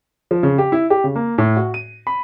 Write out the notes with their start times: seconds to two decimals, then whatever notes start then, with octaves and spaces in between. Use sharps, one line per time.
0.31 F3
0.43 C#3
0.58 G4
0.72 E4
0.90 G4
1.04 C#3
1.16 A#3
1.38 A2
1.57 F#4
1.74 D#7
2.07 B5